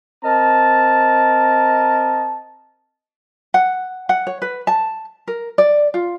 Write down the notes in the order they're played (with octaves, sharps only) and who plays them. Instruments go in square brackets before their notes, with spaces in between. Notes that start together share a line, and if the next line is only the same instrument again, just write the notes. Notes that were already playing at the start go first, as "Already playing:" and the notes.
[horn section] C4 A#4 D#5 A5
[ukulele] F#5
F#5
C#5
B4
A5
A#4
D5
F4